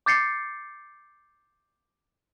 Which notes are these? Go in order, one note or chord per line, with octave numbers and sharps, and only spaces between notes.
D6 G6 A6 C7 C#7